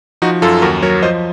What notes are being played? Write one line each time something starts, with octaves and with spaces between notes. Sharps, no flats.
F3 D#4 F#4
F#2 F4 A4
D#2 F#4 A#4
F#3 A#4 C#5
F3 C5 D#5